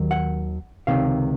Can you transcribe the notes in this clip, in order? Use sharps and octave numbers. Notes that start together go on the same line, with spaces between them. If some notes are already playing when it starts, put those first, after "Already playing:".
Already playing: D#2 D#3 F#3
F#5
C#2 C3 D#3 F5